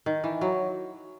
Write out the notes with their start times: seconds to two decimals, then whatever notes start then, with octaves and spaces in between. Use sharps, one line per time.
0.06 D#3
0.24 E3
0.41 F#3